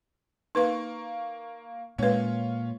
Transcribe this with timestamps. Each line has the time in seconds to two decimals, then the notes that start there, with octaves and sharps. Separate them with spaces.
0.55 A#3 D#4 B4 C#6
1.98 A#2 G#3 C#4 F4 B4